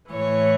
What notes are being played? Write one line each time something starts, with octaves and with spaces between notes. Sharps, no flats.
A2 E3 C#5